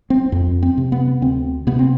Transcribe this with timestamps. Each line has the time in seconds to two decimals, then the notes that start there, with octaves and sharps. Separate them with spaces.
0.10 C4
0.32 F2
0.63 C4
0.78 C3
0.92 B3
1.21 D2 C4
1.67 C3 B3
1.79 C4